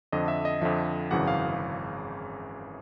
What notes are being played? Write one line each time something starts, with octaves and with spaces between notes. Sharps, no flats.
F2 D3 F3 D#5
E5
D#5
F2 D3 F3 E5
G#1 F#2 C#3 E3 F#5
F5